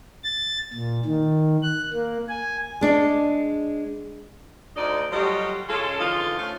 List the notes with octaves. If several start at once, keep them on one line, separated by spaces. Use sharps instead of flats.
A6
A#2
D#3
F#6
A#3
G#5
G#3 D4 D5
D2 D#4 D5
F#3 G3 A3 F4 G4 D#5
C#3 G#3 C#4 F4 A4
D3 E3 F3 D#4 F4
A3 C#4 F4